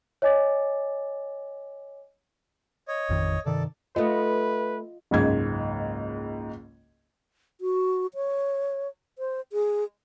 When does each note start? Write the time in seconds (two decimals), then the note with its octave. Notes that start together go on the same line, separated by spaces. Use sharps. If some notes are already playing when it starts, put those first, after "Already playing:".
0.22 C#5 D#5 G#5 D6 A6
2.88 C#5 D#5
3.09 A1 F2 D#3
3.46 G2 C3 D#3 A4 D5
3.96 A3 B3 F4 B4 D#5
5.11 F#1 C#2 G#2 G#6
7.61 F#4
8.15 C#5
9.19 C5
9.53 G#4